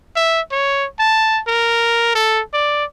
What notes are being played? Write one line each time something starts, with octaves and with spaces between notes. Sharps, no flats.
E5
C#5
A5
A#4
A4
D5